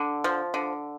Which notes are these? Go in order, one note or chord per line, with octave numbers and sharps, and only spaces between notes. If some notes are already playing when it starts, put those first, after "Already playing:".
Already playing: D3
F3
D3